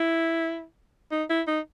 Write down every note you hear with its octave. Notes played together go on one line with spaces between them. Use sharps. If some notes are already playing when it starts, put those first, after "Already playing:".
Already playing: E4
D#4
E4
D#4